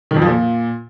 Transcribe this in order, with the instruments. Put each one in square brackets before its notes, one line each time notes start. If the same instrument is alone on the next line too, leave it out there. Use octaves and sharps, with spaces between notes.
[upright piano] D#3
F2
F3
A#2